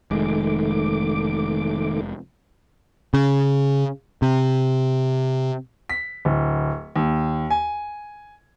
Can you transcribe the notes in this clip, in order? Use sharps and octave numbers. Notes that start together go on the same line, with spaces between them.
F1 D#3 G#3 A3 D6
C#3
C3
B6
D1
D#2
G#5